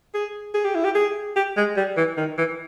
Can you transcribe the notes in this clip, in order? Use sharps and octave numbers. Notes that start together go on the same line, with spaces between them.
G#4
G#4
G4
E4
G4
G#4
G4
G#3
G3
E3
D#3
E3